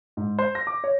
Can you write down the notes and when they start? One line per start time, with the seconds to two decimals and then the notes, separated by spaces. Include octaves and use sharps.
0.17 G#2
0.39 C5
0.55 A#6
0.67 D6
0.84 C#5